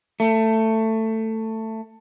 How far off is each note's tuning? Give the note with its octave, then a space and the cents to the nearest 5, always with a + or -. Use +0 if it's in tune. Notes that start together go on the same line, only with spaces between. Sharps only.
A3 +15